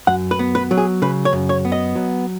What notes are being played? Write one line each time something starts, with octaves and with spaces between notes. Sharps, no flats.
F#2 F#5
B4
B3
B4
F#3
G#4
C#3 B4
C#5
F#2
C#5
B3
D#5
F#3